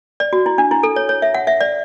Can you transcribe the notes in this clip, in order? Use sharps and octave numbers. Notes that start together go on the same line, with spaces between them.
D5
F#4
E4
D4
E4
A4
C#5
C#5
E5
F#5
E5
D5